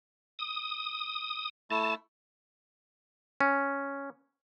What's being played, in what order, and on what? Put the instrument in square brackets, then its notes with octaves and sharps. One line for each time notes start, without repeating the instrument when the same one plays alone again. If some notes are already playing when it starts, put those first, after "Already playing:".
[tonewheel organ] D#6
[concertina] A3 E4 [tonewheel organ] A5
[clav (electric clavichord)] C#4